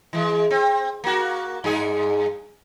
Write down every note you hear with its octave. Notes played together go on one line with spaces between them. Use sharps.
E3 G#3
C4
A#3 F#4
G2 G#4